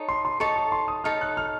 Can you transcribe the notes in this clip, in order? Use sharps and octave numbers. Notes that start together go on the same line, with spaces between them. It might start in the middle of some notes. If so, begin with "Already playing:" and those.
Already playing: D#4 A4 C#5 A5
C6
C6
D#4 A4 C#5 A5 C#6
C#6
C6
D#6
D#4 A4 C#5 A5 F6
F#6
F6